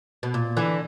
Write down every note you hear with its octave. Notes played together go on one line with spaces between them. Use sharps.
B2
A#2
D3 E3